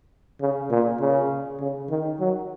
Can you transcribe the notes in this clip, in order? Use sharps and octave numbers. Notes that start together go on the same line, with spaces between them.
C#3
A#2
C#3
C#3
D#3
F#3